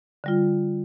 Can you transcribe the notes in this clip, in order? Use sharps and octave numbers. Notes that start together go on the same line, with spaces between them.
D3 G3 F4